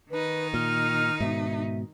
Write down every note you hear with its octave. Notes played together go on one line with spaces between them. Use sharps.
D#3 D#4 B4
A#2 F6
G#2 B2 E5